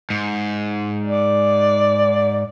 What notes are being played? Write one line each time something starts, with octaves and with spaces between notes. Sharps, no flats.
G#2
D5